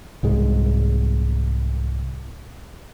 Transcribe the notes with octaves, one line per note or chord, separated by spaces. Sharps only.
C2 G#2 G#3